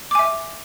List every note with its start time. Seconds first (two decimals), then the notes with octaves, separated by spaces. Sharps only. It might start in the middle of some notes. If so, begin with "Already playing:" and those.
0.11 D6
0.15 G#5
0.19 E5